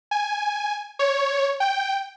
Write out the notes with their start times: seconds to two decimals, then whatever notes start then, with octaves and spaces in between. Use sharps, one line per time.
0.11 G#5
0.99 C#5
1.60 G5